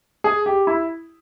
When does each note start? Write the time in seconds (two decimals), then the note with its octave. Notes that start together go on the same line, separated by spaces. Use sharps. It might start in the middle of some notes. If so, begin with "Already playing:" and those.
0.24 G#4
0.46 G4
0.67 E4